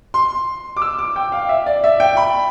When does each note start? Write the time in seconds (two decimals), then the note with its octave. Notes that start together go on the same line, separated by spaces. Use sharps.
0.14 C6
0.77 D6
0.82 E6
0.99 D6
1.16 G5
1.32 F5
1.49 E5
1.66 D5
1.84 E5
2.00 G5
2.17 B5